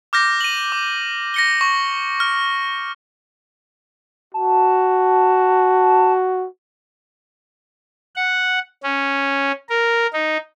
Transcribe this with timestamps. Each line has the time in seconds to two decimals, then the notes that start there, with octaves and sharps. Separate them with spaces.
0.13 D6 F6 G6 A#6
0.41 D#7 F#7
0.72 D6
1.34 A#6 C#7 G7
1.61 C#6
2.20 F6
4.34 F#4 A5
8.16 F#5
8.83 C#4
9.69 A#4
10.13 D#4